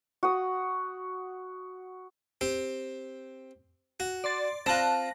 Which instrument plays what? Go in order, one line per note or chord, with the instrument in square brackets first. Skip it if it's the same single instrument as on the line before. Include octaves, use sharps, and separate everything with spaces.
[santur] F#4 D#6
[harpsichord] C4 G4
F#4
[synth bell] D5 C6 A6
[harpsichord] C4 F4 [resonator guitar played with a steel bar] A5 [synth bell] F#6 A#6